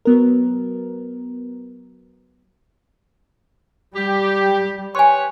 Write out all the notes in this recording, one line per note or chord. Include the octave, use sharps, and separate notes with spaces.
F#3 B3 A#4
G3 G4
G4 B4 C#5 G#5 C6